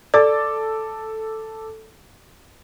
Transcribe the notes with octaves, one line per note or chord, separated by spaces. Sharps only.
A4 D5 D6 A6